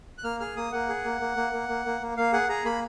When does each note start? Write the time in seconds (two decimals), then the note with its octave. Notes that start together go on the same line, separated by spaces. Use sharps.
0.18 F#6
0.24 A#3 F6
0.40 G#4 F6
0.57 A#3 D#6
0.72 A#3 F#5
0.89 G#4
1.04 A#3
1.21 A#3
1.37 A#3
1.53 A#3
1.69 A#3
1.86 A#3
2.01 A#3
2.17 A#3 F5
2.33 G#4 F#5
2.49 G#4 A#5
2.65 A#3 B5